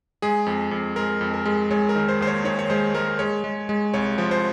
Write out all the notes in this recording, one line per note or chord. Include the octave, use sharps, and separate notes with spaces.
G#3 G#4
F2
F2
G#3 A#4
F2
A#4
G#3
G#3 C#5
A#4
D#3
C5
D#2 C5
C#5
D#3 C#5
C#5
G#3 C5
G#3 A#4
G#3 C#5
G#3
G#3
C2 C#5
F3
C5